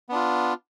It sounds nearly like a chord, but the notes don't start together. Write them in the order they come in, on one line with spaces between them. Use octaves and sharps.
B3 D4 F4